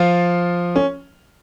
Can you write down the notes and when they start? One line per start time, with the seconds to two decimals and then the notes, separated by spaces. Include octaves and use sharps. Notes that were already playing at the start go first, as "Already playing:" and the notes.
Already playing: F3 F4
0.76 C#4